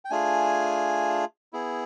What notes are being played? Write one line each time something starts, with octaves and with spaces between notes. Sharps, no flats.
G5
A3 D4 F4 G#4 G#5
B3 E4 G#4